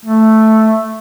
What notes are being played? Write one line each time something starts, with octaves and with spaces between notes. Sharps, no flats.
A3